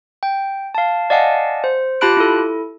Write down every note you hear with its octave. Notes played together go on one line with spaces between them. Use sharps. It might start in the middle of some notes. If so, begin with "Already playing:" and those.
G5
F5 A5
D5 D#5 F5 F#5 G#5 A5
C5
F4 G4 A5 B5 F#6 D7
E4 A4